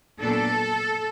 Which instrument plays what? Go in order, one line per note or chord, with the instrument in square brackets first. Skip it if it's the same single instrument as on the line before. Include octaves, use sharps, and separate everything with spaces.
[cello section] A#2 F#3 B3 D4 A4